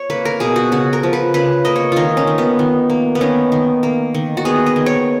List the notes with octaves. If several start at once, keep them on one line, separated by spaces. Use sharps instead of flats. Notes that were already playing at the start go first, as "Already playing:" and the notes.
Already playing: C#5
A#3 B4
A#4
B2 G#4
F#4
C#3 F#4
A#4
F3
B4
C#3 B4
A#3 D#5
C#5
D#3 D#4 F4
C#4
D#3
B3
D#3
A#3
B3
D#3 C#4
D#3
A#3
D#3
F#4
B3 G#4
D#5
D#3
C#5